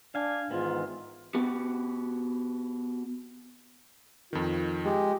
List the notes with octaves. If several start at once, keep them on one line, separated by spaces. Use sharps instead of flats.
D4 F5 G#5
G#2 D#3 E3 B3 F4
B3 F#4 G4
F2 D#3 F4
G#3 G4